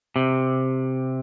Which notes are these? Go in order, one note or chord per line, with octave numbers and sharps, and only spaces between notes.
C3